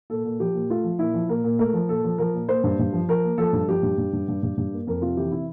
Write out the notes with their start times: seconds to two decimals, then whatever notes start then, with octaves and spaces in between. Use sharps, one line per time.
0.10 A#2 A4
0.25 A#2
0.40 F3 G4
0.54 A#2
0.70 A3 F4
0.84 F3
0.99 A#2 E4
1.14 F3
1.29 A#2 A#4
1.44 A#2
1.59 A3 A#4
1.74 F3
1.89 A#2 A4
2.04 F3
2.18 F3 A#4
2.34 A#2
2.49 A#3 C5
2.64 G2
2.79 G2
2.93 F3
3.08 F3 A#4
3.23 A#3
3.38 F3 A4
3.53 G2
3.68 F3 G4
3.83 G2
3.98 G2
4.13 G2
4.28 G2
4.43 G2
4.57 G2
4.73 A#3
4.87 F2 A#4
5.02 C3 F4
5.17 E3 G4
5.32 C3 E4